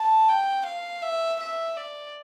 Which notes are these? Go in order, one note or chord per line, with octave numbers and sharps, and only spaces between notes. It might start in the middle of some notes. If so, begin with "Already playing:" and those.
Already playing: A5
G5
F5
E5
E5
D5